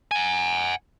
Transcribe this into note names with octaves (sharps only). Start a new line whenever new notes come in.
F#5 G#5